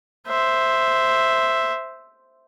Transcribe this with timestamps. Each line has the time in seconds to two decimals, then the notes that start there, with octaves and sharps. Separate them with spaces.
0.28 C5 E5